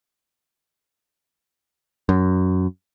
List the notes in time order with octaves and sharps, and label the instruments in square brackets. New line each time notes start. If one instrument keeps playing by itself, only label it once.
[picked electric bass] F#2